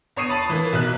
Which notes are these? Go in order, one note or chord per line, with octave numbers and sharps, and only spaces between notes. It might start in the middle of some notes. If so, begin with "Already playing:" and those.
E2 C#5 D#6 C7 D#7
A5 B5 D#6 A6
E3 A#3
B1 D#4 F#6